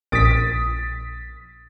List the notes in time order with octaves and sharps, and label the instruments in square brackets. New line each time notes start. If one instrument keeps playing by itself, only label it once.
[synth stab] A#1 B6 [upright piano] D#6 A6 D7